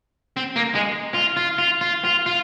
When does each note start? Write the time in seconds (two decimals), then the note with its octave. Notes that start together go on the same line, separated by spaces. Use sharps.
0.37 C4
0.56 A#3
0.75 G#3
1.14 F4
1.37 F4
1.58 F4
1.81 F4
2.05 F4
2.26 F4